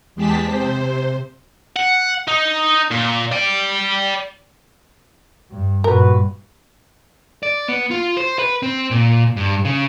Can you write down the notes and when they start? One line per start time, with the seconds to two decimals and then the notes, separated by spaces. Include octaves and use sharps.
0.15 E2 G#3 G4 G#4 A5 B6
0.45 C3 C5
1.76 F#5
2.28 D#4
2.91 A#2
3.32 D5 G5
5.51 G2
5.84 G2 A#2 B3 F#4 A#4 B4
7.43 D5
7.68 B3
7.91 F4
8.17 C5
8.39 B4
8.63 C4
8.91 A#2
9.36 G2
9.65 C#3